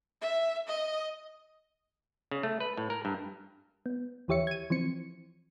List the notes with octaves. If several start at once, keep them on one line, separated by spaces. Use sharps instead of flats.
E5
D#5
C#3
A3
B4
A2
A#4
G2
B3
D#2 E3 G4 C#5 E5 C#7
G#6 D#7
E3 F3 C4 C#7